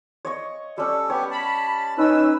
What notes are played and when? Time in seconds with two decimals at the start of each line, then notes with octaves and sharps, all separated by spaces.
0.25 C#5 D#5 C#6
0.78 G3 C#4 A4
1.10 B3 G4 C#5
1.31 A5 B5
1.97 C#4 D#4 B4 E6